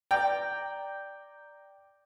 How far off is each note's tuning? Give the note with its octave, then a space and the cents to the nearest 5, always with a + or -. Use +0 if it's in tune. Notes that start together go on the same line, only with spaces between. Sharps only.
D5 +0 G5 +0 A#5 -5